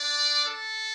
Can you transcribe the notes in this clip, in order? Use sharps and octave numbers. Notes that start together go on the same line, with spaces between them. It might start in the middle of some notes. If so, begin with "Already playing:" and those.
Already playing: D4 D5
A4